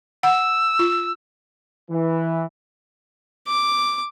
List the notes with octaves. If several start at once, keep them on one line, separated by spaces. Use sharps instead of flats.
F#5 E6
F4
E3
D6